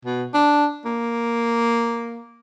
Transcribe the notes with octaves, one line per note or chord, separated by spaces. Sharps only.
B2
D4
A#3